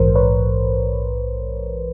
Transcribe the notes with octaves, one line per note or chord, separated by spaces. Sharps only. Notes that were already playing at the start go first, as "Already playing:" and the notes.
Already playing: A#1 G#2 E3 A#4 C5
B4 C#5